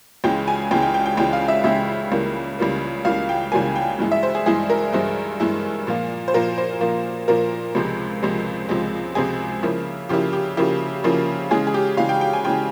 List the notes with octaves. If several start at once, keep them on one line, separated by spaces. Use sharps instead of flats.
C#2 C#3 E3 G#3 G5
G#5
C#2 C#3 E3 G#3 G5
G5
G5
G5
C#2 C#3 E3 G#3 G5
F5
E5
C#2 C#3 E3 G#3 E5
C#2 C#3 E3 G3 A#3
C#2 C#3 E3 G3 A#3
C#2 C#3 E3 G3 A#3 F5
G5
C#2 C#3 E3 G3 A#3 G#5
G5
G2 E3 G#3 E4
E5
C5
G#4
G2 E3 G#3 E4 G#4
A#4
G2 E3 G#3 E4 C5
G2 E3 G#3 E4
A#2 F3 A#3 F4
C5
A#2 F3 A#3 F4 A#4
C5
A#2 F3 A#3 F4
A#2 F3 A#3 F4 A#4
C#2 C3 F3 G#3 C4
C#2 C3 F3 G#3 C4
C#2 C3 F3 G#3 C4
C#2 C3 F3 G#3 C4 G#4
C#3 F3 A#3 E4
C#3 F3 A#3 E4 G4
G4
C#3 F3 A#3 E4 G4
C#3 F3 A#3 E4
C#3 E3 G#3 G#4
G#4
G4
C#3 E3 G#3 F5
G5
G5
G#5
C#3 E3 G#3 G5